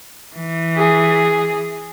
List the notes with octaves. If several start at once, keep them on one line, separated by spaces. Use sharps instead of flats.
E3
G#4